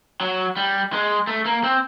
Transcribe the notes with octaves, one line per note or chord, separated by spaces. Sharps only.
F#3
G3
G#3
A3
A#3
C4